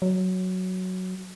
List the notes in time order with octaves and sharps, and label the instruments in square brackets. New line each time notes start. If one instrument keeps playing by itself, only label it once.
[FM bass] F#3